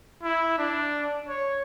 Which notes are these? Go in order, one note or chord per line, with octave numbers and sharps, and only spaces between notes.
E4
D4
C#5